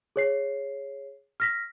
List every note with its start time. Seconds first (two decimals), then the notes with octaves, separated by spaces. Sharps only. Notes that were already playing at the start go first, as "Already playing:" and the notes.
0.16 G#4 C#5 C7
1.40 F6 A#6 B6